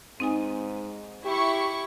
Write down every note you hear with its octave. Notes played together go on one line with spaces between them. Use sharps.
G#2 C4 D#4 G#5
E4 G4 C#6